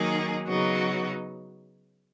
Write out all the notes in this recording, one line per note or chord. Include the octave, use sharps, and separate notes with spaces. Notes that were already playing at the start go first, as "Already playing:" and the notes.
Already playing: D#3 F#3 A#3 D#4 G#4
C#3 F#3 B3 D#4 F#4